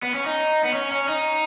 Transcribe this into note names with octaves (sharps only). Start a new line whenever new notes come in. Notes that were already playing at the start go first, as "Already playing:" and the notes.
B3
C#4
D#4
B3
C#4
C#4
D#4